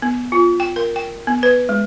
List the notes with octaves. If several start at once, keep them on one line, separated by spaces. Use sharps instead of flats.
B3
F4
G5
A#4
G5
B3
B4
G#3